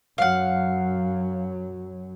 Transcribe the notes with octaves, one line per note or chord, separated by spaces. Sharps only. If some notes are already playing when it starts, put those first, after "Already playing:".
F#2 F#3 F5 F#5